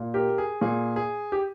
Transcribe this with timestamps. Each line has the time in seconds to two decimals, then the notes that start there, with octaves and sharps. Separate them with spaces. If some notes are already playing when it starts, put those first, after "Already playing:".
Already playing: A#2
0.14 G4 A#4
0.38 G#4
0.61 A#2 G#4
0.96 G#4
1.32 G4